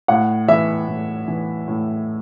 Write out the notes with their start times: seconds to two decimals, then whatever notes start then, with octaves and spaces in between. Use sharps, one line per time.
0.08 A2 F#5
0.48 E3 E5
0.88 A2
1.28 E3
1.68 A2